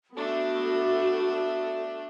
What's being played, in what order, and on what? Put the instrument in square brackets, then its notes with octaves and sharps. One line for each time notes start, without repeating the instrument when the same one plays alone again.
[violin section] A3 D4 [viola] B3 F#4 [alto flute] A4